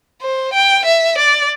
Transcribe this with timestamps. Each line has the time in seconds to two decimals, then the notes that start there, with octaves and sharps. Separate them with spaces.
0.22 C5
0.54 G5
0.86 E5
1.18 D5